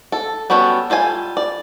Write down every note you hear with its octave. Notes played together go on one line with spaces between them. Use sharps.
A4
G3 B3 C#4 F#4 A4
G3 F4 A4 G#5
D5